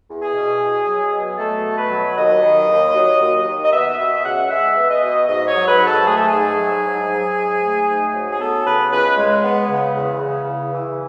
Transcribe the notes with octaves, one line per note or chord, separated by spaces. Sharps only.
E2
G#4
B2
B2
F#3
B2
A3 A4
B2
B4
F#3
D#2 D#5
D#3
D#2
F#3
D#2
D#3
D#5
B3 E5
B2 E5
C#2 F#5
G#3 E5
B3
D#5
B2
G#2 D#5
C#5
F#3
B4
G#2
A4
A3 G#4
A4
G#4
G#2
F#3
G#2
F#3
G#2
A3
G#2
F#3
G#4
B3 A4
C#3 B4
C#2 B4
G#3
B3
C#3
E2
C#3
E2
E3